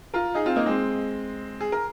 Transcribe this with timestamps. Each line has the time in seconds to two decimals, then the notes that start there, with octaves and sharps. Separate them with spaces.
0.14 F4 A#4
0.34 D#4 G#4
0.45 C4 F4
0.56 A#3 D#4
0.66 G#3 C4
1.60 G#4
1.72 A#4